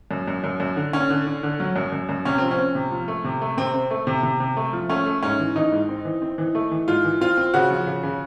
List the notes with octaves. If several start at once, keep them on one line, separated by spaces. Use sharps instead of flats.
F#2
F#2
F#2
F#2
D3
D3 C#4
D3
D3
D3
F#3
F#2
F#2
F#2
C3 C#4
F3 C4
C#4
C4
C3
F3
A3
C3
A3
C3 C4
C4
A3
C3
C3
C3
A3
F3
A3 C#4
A3
G#2 C#4
E3
E3 D#4
G#2
C4
E3
C4
E3
A3
E3
G#2 F4
E3
C4 F4
C4
C#3 F#4
F3
C#3
C#3